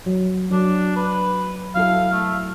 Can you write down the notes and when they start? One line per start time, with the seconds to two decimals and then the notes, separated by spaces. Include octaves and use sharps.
0.06 F#3
0.51 F#3 D4
0.97 B4
1.75 F#3 E4 A4 F5
2.12 A3